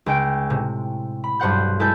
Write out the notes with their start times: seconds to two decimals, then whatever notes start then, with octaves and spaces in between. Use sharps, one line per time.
0.06 C#2 G5 D7
0.50 A2 C3
1.24 B5
1.40 B1 G2 C5 F#5 G6
1.79 G#3 E4 A4 B4 G6